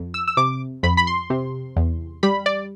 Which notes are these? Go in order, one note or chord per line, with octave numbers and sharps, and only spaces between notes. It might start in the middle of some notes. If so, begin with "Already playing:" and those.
Already playing: F2
E6
E6
C3 D6
F2 B5
B5
C6
C3
E2
G3 B5
D5